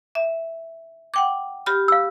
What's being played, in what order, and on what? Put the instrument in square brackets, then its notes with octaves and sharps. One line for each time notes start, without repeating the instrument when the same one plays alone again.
[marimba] E5
F#5 G5 D6
G4 B5 F6
[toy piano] F5 E6